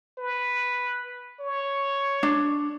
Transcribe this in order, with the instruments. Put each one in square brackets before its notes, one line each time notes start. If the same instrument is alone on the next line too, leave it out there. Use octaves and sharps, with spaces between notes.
[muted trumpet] B4
C#5
[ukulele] D4